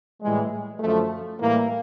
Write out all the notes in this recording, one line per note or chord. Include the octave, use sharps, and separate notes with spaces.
A2 E3 G3 G#3
F#2 D3 F3 A3
A2 E3 G3 A#3